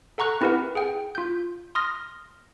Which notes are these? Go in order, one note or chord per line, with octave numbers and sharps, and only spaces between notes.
A4 F#5 A#5 C#6 F#6
C4 E4 G4 A#4 B4 F#5
G#4 F#5 G5
F4 G6
C6 D#6 F6 A#6